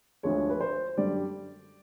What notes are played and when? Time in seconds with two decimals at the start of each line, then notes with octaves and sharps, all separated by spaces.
0.23 D2 D3 F3 G#3 C#5
0.50 B4
0.61 C5
0.97 F#2 D3 G3 D5